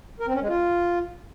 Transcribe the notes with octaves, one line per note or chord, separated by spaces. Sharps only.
A#4
C4
C#4
G#3
F4